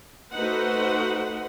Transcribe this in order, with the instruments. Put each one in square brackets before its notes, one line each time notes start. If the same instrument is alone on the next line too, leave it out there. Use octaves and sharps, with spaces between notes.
[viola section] A3 D#4 F#4 B4 C5 F#5